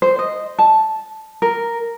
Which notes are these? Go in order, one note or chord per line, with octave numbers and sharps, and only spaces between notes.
C5
D#5
A5
A#4